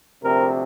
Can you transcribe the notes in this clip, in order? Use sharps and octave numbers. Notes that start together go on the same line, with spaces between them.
D2 C3 F3 C4 A#4